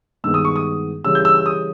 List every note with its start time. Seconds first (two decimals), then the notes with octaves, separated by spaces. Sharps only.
0.24 G2 D#3 G#3 B3 E6
0.34 D#6
0.45 C#6
0.56 D#6
1.04 C#3 E3 G3 C#4 E6
1.15 G6
1.25 E6
1.35 E6
1.46 D#6